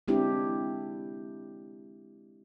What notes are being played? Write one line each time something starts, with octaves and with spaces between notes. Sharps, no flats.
G#3 C4 D4 E4 G4